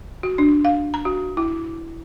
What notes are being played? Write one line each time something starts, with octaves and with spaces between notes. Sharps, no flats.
F#4
D4
F5
A#5
F#4
E4